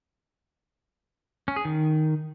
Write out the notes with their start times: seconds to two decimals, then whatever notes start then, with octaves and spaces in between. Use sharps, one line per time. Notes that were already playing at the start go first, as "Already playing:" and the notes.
1.48 C#4
1.56 G#4
1.65 D#3